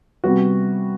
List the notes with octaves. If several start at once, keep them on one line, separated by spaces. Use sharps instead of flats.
C3 G3 B3 F#4